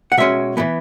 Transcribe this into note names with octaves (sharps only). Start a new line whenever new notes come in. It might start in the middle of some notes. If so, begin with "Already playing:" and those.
F#5
B2 G#3 C#4 E5
A2 E3 B3